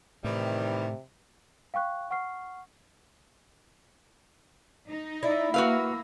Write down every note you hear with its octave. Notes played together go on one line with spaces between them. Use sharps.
A2 C3 D#3 E3 G3
F5 G5 C#6 F#6
F#5 C#6 F6 C7
D#4
E4 D5
A#3 F#4 B4 F5 E6